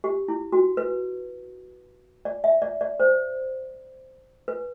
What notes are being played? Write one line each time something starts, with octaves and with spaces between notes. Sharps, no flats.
G4
E4
F#4
B4
D5
E5
D5
D5
C5
B4